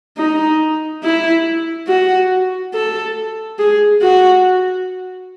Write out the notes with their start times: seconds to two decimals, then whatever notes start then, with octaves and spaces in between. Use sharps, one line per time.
0.17 D#4
1.03 E4
1.88 F#4
2.74 A4
3.59 G#4
4.02 F#4